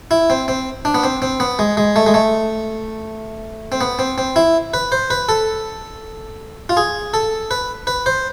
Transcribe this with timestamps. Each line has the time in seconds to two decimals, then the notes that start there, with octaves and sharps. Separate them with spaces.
0.11 E4
0.30 C4
0.48 C4
0.85 D4
0.94 B3
1.03 C4
1.22 C4
1.40 B3
1.59 G#3
1.77 G#3
1.96 A3
2.06 G#3
2.14 A3
3.72 C4
3.81 B3
3.99 C4
4.18 C4
4.36 E4
4.74 B4
4.92 C5
5.10 B4
5.29 A4
6.69 F4
6.77 G#4
7.14 A4
7.51 B4
7.87 B4
8.06 C5